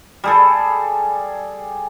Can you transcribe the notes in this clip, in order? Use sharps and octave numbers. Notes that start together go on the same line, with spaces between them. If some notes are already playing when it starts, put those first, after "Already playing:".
G3 G#4 A4